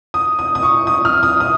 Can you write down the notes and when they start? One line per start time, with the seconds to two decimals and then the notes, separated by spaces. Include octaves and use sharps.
0.14 D#6
0.39 D#6
0.55 D#6
0.63 C#6
0.87 D#6
1.05 F6
1.23 D#6
1.40 D#6